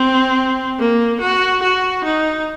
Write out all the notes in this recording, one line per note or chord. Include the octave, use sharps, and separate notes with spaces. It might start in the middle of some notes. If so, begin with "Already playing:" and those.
Already playing: C4
A#3
F#4
F#4
D#4